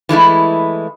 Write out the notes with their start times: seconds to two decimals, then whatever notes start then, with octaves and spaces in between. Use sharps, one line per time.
0.09 E3 G#3 A3 E4